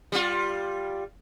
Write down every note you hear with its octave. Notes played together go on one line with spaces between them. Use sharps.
G3 F4